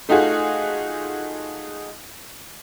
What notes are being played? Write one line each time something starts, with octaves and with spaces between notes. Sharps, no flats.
A3 D#4 F4 F#4 G#4